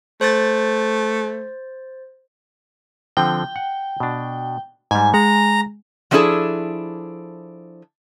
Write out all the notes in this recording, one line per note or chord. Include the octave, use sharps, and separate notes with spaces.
A3 C5 A6
D3 F3 C4 G5
F#5
B2 D4
G#2 G3 G#5
G#3 F#5 A#5
F3 F#3 D4 E4 G#4 A4